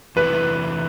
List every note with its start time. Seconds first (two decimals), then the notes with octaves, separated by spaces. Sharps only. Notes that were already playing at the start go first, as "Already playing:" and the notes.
0.16 E2 C3 E3 A3 E4 B4